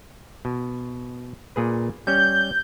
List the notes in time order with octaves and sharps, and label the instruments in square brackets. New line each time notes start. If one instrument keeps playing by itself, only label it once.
[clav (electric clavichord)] B2
A#2 G#4 B4
[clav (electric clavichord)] G3 C#4 [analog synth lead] G6